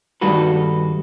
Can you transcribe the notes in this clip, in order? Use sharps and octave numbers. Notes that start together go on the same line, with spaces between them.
G2 D#3 G3 F#4 A4 B4